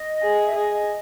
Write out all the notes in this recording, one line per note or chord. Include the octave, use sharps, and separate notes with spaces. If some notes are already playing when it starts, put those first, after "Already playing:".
Already playing: D#5
G#4
E5
G#4 D#5